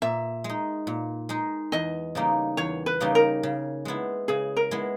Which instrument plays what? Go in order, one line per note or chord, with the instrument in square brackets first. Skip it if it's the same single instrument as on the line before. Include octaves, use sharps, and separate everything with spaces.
[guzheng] A#2 [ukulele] E5
[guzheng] G#3
D#4
A#2
G#3 D#4
[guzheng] E2 [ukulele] D#5
[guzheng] C#3 G3 A#3 D#4
[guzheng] E2 [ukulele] C#5
[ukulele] B4
[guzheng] C#3 G3 A#3 D#4
[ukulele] A#4
[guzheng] C#3
G#3 B3 E4
[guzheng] C#3 [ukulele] G#4
[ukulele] A#4
[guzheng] G#3 B3 E4